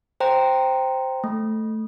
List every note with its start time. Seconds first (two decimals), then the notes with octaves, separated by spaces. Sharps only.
0.20 C5 G5 A#5
1.24 A3